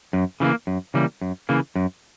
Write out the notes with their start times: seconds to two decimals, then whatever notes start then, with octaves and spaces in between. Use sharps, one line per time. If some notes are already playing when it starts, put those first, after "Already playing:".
0.13 F#2
0.40 C#3 E3 G3 A#3
0.67 F#2
0.94 C#3 E3 G3 A#3
1.21 F#2
1.49 C#3 E3 A#3
1.76 F#2